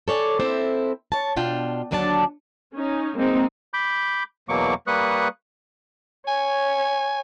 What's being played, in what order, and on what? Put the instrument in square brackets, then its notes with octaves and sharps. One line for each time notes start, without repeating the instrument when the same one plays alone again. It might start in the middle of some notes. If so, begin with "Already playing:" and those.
[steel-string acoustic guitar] A4 C#5 D5 G#5
C4 E4 A4 C5 E5
C#5 A5
B2 D4 F4 G5
D#2 D3 F#3 D4 A4 A5
[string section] C#4 D#4
G#3 A#3 C4 D#4
[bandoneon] B5 D6 G6
E2 B2 F#3 A#3 C#6 D6
G3 A#3 B4 C#6 D#6 F#6
[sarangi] C#5 [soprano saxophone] G#5